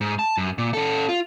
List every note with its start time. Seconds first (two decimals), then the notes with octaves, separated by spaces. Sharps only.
0.01 G#2
0.19 A5
0.37 F#2
0.58 A#2
0.74 C#4 A4
1.09 F4